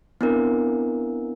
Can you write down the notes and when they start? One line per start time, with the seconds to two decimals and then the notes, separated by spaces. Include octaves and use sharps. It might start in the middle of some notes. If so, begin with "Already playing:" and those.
0.21 B3 C4 D4 E4 A#4